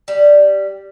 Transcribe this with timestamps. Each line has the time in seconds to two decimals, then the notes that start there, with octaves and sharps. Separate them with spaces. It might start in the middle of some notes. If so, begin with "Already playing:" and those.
0.08 G3